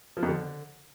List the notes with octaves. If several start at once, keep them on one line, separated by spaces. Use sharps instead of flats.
F3
F2
D3